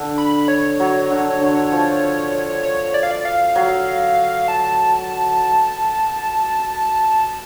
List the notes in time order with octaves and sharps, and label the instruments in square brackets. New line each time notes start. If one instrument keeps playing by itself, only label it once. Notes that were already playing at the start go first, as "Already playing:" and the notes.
Already playing: [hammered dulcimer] D3
[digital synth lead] B5
C#5
[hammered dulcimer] F#3
D3
D3
F3
[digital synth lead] C#5
D5
F5
D5
F5
[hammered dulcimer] F#3
[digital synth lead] A5